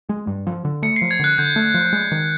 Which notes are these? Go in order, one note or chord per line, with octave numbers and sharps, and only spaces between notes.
G#3
G2
F3
D3
A3 C#7
C7
F3
G#6
D3 F#6
D3 G6
A3
F3
G#3
D#3